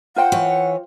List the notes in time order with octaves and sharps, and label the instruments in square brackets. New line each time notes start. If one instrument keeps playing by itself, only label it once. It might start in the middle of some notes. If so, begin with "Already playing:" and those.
[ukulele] F4 C5 G5 [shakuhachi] F#5
[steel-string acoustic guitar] E3 C#5